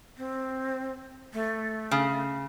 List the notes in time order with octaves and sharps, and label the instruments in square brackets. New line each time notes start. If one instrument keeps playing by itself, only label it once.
[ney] C4
A3
[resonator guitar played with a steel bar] C#3